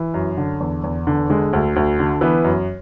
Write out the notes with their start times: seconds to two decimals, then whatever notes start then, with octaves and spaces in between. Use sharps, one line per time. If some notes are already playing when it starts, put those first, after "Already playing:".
Already playing: E3
0.14 F#2
0.37 D3
0.60 E2
0.84 E2
1.07 D3
1.30 D3 G#3
1.53 D2
1.76 D2
1.99 D3
2.21 E3 B3
2.44 F#2